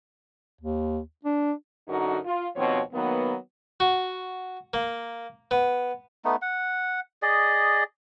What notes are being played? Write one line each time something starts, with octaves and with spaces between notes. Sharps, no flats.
D#2
D4
F#2 D3 D#4 F#4 A#4
F4
D#2 B2 F3 C4 F#4 C#5
D#3 F#3 A#3 B3
F#4
A#3
B3
A3 B3 D#4
F#5
G#4 D5 D#5